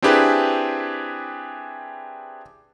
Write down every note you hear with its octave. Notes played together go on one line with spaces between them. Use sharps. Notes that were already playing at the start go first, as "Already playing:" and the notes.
C4 D4 E4 G4 G#4 B4